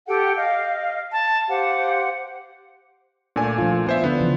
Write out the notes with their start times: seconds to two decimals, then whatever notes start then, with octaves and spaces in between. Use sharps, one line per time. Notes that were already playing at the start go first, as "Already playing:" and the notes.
0.08 G4 A4 F#5 G5
0.36 D#5 F5
1.12 A5
1.48 G4 C5 F5 F#5
3.36 A#2 A3 D4 D5 G#5
3.58 F3 D4 F4
3.87 B3 F4 C5 E5
4.04 D3 B3 D4 F4
4.20 C#3 E3 F3